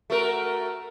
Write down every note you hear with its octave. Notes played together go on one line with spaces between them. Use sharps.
A3 F#4 A#4